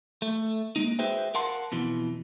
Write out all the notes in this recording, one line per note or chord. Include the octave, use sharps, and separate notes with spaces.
A3
G#3 A#3 D#4
F#4 G#4 B4 C5 E5 G5
A#4 F5 F#5 A5 C6
F2 B2 E3